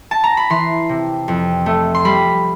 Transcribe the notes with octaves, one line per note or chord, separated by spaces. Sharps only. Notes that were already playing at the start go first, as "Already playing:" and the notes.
A5
A#5
B5
E3 C6
C3
F2
A3
C6
G3 B5